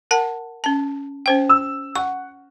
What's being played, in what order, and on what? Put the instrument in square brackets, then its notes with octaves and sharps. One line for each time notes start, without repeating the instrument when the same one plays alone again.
[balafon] A#4 F#5 A5
C#4 A5
C#4 C5 G5
[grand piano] E6
[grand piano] F#5 [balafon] C#6